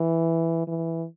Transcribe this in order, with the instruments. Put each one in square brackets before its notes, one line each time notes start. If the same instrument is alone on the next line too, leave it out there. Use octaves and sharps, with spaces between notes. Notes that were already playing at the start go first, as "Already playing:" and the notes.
Already playing: [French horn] E3
E3